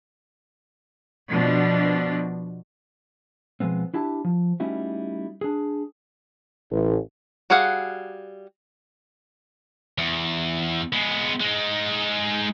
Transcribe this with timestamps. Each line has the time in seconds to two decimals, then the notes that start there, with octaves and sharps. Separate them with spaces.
1.31 B2 F3 D4
3.60 B2 F3 G#3 B3 C4
3.94 D4 E4 G4 A5
4.24 F3
4.60 G3 A3 C#4 D#4 E4 F#4
5.41 D4 G#4
6.71 A1
7.50 G3 F#4 G#4 F5 F#5
9.98 E2
10.93 G#3 B3
11.40 G#3 D#4